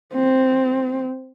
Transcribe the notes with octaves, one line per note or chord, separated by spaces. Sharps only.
C4